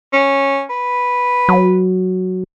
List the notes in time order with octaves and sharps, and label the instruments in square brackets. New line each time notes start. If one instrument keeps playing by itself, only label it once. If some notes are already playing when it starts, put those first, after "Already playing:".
[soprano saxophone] C#4
B4
[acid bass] F#3